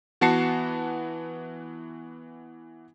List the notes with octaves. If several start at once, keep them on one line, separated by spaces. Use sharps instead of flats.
E3 B3 F#4 A5 C7 C#7